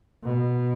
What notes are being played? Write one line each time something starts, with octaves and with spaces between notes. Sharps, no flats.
B2